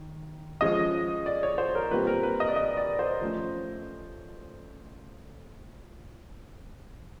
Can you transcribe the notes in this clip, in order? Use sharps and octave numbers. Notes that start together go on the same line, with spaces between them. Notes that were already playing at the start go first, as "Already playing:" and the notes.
Already playing: D#3
F3 G#3 C#4 D#5
D5
C#5
C5
A#4
A#2 G3 C4 B4
A#4
B4
D#5
D5
D#5
D5
C5
F3 A3 C#4